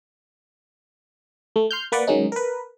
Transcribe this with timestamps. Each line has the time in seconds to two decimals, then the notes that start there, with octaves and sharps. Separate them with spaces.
1.56 A3
1.71 C6 F6 G6
1.92 A#3 B4 D5 F#5
2.07 D#3 F#3 G#3 C#4 D#4
2.32 A#4 B4